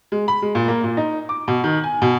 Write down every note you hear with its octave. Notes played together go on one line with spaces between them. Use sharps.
G#3
B5
G#3
A#2
A#3
A#2
D#4
D6
B2
D#3
G#5
B2